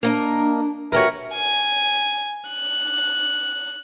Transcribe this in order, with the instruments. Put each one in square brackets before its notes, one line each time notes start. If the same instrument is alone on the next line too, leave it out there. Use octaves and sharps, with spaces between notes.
[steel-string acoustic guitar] A#3 A#4 D#5 [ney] D4
[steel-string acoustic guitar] F#4 G4 B4 [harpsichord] A#4 C#5 [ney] E5
[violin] G#5
F#6